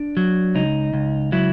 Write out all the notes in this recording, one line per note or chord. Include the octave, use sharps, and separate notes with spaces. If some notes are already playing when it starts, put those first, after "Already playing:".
Already playing: D4
F#3
C#2 D#4
C#2
F#3 E4